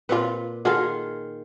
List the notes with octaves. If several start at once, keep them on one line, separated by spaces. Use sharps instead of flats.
A#2 C4 F4 B4
D#3 F4 F#4 G#4 A4